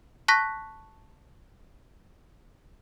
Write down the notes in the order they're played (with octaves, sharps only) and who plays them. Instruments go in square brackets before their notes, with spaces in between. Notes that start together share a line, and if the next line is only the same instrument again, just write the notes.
[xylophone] A5 C#6 F#6 A#6 B6